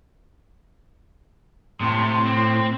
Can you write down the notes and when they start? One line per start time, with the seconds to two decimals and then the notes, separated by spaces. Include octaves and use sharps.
1.81 A2 C3 C6
2.27 C4